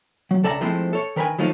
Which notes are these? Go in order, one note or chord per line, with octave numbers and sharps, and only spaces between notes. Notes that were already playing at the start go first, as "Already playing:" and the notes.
F#3
C#2 A4 D5 E5 G#5 A#5
F3 G#3 A3 C4 E4
A4 C#5
D#3 A#4 B4 G5 G#5
D#3 F3 F#3 A3 D#4 F4